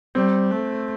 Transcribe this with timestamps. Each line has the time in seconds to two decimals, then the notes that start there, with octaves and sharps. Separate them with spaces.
0.15 G3 C4
0.51 A3